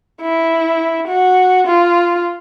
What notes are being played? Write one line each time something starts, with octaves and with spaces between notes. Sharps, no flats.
E4
F#4
F4